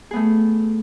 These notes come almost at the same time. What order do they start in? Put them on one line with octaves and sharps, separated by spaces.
G#4 B3 A3